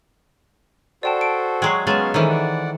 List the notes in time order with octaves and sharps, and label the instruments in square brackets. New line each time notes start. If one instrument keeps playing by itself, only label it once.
[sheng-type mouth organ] F#4 A4 C5 [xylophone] D5 G5 A5
[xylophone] D7
[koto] F#3 G#3 [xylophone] G5 C#6 C7
[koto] F#3 G#3 [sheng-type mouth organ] B3 C#4 F5 [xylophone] A6 E7
[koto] D#3 E3 [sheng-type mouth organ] C#4 F6 [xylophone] A4 C5
[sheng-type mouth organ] D5 F#5